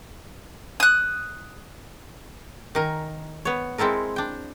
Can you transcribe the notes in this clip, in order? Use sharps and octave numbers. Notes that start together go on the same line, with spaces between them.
D#6 F#6
D#3 A#4 G#5
B3 C#5
G#3 C4 E4 A4 A#4
D4 G5